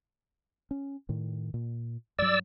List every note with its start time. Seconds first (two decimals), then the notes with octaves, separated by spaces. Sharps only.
0.71 C#4
1.09 A2 D#3
1.54 A#2
2.19 G2 F#3 D5 E6